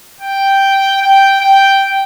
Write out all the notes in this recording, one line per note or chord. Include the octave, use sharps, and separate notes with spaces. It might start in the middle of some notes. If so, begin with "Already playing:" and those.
G5
G5
G5